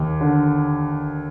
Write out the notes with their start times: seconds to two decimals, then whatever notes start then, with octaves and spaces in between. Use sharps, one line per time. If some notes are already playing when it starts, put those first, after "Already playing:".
Already playing: D#2
0.21 D3